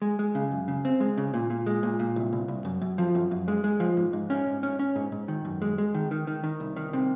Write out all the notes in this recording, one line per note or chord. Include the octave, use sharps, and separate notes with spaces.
G#3
G#3
C#3
F#2
C#3
C4
G#3
C#3
A#2
A#2
G#3
A#2
A#2
C2
C2
C2
F#2
F#2
F3
F#2
F#2
G#3
G#3
F3
G#2
G#2
C#4
G#2
C#4
C#4
G#2
G#2
D#3
F#2
G#3
G#3
D#3
D#3
D#3
D#3
C2
D#3
C3